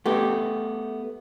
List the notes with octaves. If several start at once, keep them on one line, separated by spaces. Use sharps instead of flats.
A3 B3 G4